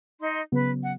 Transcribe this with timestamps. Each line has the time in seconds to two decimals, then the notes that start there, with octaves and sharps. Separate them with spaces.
0.21 D#4 D#5 C6
0.52 C#3 F#3 B3 B4
0.82 F#5